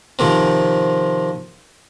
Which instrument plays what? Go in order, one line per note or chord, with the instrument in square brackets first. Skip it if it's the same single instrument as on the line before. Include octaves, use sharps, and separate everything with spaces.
[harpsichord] C3 D#3 F3